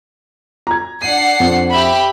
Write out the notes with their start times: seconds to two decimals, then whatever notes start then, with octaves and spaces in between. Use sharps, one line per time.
0.67 A#5 G#6
1.02 D4 F#5 C7 D#7
1.40 F2
1.70 G4 E5 B5